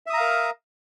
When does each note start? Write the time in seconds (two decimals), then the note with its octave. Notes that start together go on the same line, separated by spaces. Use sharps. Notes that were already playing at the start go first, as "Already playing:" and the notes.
0.06 E5
0.10 D#6
0.14 A#5
0.17 F5
0.21 A#4